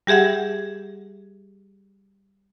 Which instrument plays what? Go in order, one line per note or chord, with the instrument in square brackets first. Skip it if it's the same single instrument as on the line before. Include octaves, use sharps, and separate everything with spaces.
[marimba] G3 G4 G#4 E5 F#5